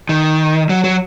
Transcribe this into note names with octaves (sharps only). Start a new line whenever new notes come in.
D#3
F#3
F#3